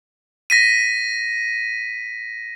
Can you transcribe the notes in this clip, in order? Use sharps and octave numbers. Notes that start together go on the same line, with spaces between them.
A#6 B6 D#7